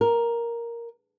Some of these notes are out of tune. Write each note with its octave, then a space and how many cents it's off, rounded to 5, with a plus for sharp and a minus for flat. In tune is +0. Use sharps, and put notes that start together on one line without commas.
A#4 +5